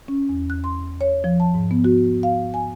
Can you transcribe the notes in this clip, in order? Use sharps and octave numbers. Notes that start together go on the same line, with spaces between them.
C#4
E2
F#6
C6
C#5
F3
A5
G#2
B3
F#4
F5
G#5